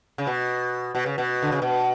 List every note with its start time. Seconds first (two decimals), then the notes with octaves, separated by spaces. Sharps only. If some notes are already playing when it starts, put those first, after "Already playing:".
0.18 C#3
0.27 B2
0.95 B2
1.06 C#3
1.18 B2
1.42 D3
1.52 C#3
1.62 B2